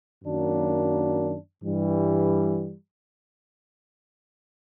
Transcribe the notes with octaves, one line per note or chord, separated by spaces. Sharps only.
F#2 D#3 F#3 A#3 D4
G2 E3 G3